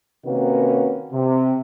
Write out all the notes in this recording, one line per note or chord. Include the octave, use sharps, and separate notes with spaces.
C3 D#3 A#3 C#4 F#4 B4
C3